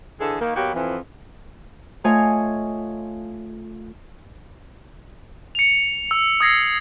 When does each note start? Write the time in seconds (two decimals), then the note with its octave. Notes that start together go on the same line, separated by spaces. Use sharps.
0.21 D3 E3 G#4 A4
0.41 D#3 A#3
0.56 B2 F#3 A#3 F#4 G4
0.75 F2 E3
2.04 A3 F4 C#5 D#5 F5 G#5
5.55 C#7 F7
6.11 E6
6.40 D#6 E6 G#6 A#6 C7